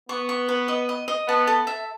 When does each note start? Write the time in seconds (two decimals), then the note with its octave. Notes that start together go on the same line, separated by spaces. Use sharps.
0.09 B3 C#6
0.29 C#6
0.49 B4
0.68 D#5
0.89 D#5
1.08 D#5
1.28 B3 A5
1.47 A4
1.67 E5